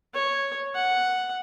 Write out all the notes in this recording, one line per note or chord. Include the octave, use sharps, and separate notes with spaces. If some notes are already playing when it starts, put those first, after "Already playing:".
C#5
F#5